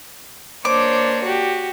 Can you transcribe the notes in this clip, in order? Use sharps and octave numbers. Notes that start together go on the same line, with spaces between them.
A#3 D4 C5 C#5 D6
F#4 G4